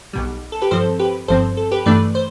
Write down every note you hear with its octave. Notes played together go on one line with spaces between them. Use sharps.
B1 B2 G3
A4
G4 B4
G2 F3 C4 A4 C5
G4 B4
G1 G2 F3 C4 A4 C5
A4
G4 B4
G2 E3 A3 D4 B4 D5
C5